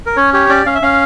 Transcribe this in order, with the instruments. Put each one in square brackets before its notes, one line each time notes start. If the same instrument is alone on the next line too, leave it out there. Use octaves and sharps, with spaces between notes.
[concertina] A#4
C#4 C#5
G4 C#5
C#4 D5
C#4 F5
E5
C#4 F5